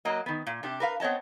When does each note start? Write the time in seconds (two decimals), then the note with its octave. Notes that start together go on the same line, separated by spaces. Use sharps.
0.05 F#3 A#3 D#5
0.26 D#3 B3
0.47 A#2
0.63 C3 D4 G4
0.80 A#4 B4 F5
1.00 B3 C4 C#5 D#5 A5